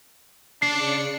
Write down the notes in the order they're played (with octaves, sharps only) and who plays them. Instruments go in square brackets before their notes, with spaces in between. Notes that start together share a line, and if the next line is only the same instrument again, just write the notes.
[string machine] C#3 D5 C#7 [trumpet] D4 [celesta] C7